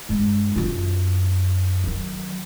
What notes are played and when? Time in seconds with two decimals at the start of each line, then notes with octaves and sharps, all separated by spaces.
0.09 G2 G#3
0.56 F#2 F4
1.84 D#3 F#3